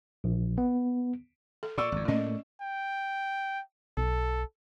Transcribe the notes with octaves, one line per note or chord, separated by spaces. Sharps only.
A#1
B3
A4
A#2 D5 C#6 E6
G#1 F2
A2 A3 A#3 C#4 D#5
G5
B1 A4